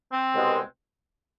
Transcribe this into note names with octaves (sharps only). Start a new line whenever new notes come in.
C4
C2 B2 G#3